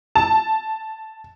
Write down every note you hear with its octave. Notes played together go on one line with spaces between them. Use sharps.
A5